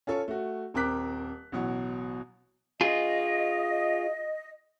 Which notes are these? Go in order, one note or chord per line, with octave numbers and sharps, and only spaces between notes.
C#4 F4 A4 C#5
A3 F#4
D#1 C4 A#4 D6 F#6 B6
A1 B2 F#3 F#5
F4 G#4 D#5